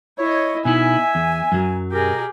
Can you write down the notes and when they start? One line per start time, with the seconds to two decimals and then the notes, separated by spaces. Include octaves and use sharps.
0.19 E4 C#5 D#5
0.65 B2 D#4 E4 E5 G#5
1.15 E2
1.52 F#2 F#3
1.92 B2 G4 G#4 A#4